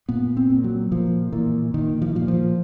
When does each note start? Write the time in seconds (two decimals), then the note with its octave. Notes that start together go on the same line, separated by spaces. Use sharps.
0.09 A#2 B3
0.37 C4
0.50 A#2
0.64 F#3
0.91 A#2 F3
1.32 A#2 E3
1.74 A#2 D#3
2.02 F3
2.09 E3
2.15 A#2 F3
2.28 F3